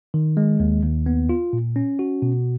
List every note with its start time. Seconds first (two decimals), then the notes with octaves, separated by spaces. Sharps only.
0.14 D#3
0.37 G#3
0.60 D#2
0.83 D#2
1.06 B3
1.29 F4
1.53 A#2
1.76 C#4
1.99 F#4
2.22 B2